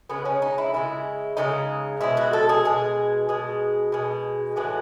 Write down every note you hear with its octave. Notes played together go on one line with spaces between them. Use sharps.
C#3 G#3 B3
C#4
D#4
E4
C#3 G#3 E4
C#3 G#3 D#4
B2 G#3 E4
F#4
A4
G#4
B2 G#3 G#4
B2 G#3
B2 G#3
A2 E3 G#3 F#4